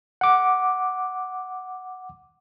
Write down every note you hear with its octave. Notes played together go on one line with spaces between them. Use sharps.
F#5 D6